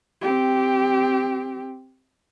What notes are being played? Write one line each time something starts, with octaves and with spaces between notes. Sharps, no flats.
C4 G4